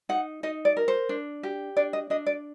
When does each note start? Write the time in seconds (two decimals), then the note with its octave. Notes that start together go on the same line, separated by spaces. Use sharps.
0.09 D#4 F#5
0.43 D#4 D#5
0.65 D5
0.77 A#4
0.88 C5
1.09 D4
1.43 G4
1.77 D4 D5
1.93 D#5
2.10 D4 D#5
2.26 D5